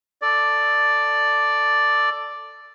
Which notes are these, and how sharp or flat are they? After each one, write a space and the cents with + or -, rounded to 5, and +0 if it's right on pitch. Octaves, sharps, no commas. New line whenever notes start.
A4 +0 D5 +0